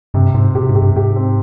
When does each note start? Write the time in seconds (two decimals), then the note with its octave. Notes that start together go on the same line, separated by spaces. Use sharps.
0.14 G2 C3
0.34 G#2 C4
0.55 B2 G4
0.69 G#2
0.75 G4
0.82 G2
0.96 G#2 G4
1.16 C4